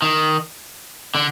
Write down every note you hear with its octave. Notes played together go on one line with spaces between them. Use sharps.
D#3
D3